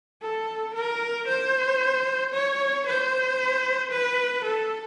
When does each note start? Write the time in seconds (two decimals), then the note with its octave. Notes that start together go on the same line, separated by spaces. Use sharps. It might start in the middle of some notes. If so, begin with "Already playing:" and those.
0.22 A4
0.74 A#4
1.28 C5
2.33 C#5
2.86 C5
3.91 B4
4.44 A4